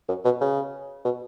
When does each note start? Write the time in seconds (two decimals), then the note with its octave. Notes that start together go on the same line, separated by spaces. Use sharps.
0.09 F#2
0.25 B2
0.41 C#3
1.05 B2